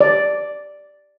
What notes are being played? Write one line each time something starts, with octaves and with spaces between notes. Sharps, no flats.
D5